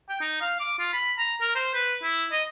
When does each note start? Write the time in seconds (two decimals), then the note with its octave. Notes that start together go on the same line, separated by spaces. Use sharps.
0.09 G5
0.21 D#4
0.41 F5
0.60 D6
0.79 F4
0.93 B5
1.18 A#5
1.41 A#4
1.55 C5
1.74 B4
2.03 E4
2.32 D#5